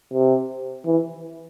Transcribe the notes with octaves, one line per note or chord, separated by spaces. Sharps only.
C3
E3